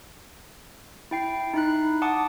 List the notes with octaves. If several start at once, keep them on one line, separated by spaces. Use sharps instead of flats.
E4 G5 C7
D#4 E4 B5 F#6
F#5 A5 D6 D#6